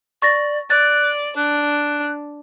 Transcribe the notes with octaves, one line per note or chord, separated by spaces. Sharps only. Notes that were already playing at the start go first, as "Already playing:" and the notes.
D5 C#6 A6 A#6
D5 F#6 A6
D4 F#6